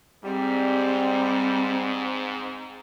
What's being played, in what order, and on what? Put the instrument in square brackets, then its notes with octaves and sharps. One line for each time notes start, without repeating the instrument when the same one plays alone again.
[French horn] G#2 [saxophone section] G3 [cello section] C4